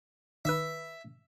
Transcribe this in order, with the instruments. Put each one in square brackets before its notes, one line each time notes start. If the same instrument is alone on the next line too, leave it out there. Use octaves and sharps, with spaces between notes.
[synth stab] D#3 B4 [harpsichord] E5